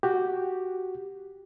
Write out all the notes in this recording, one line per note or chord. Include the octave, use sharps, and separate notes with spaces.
F#4 G4